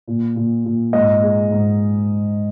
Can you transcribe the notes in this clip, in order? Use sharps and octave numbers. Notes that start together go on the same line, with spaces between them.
A#2
A#2
A#2
G#2 D#5
G#3
G#2